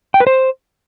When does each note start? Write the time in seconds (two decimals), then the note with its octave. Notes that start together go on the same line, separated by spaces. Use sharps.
0.14 G5
0.20 B4
0.27 C5